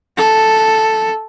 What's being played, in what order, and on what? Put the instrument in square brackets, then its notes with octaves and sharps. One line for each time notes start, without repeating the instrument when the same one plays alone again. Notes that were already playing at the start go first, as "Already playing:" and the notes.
[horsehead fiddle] A4